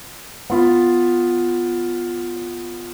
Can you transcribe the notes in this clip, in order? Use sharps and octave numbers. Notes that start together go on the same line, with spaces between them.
B3 F4 B5